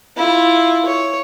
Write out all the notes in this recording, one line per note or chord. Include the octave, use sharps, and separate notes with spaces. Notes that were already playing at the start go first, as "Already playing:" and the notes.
E4 F4
C#5